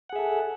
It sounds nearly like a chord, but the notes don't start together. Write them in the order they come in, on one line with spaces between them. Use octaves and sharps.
F#5 G#4 E5 A4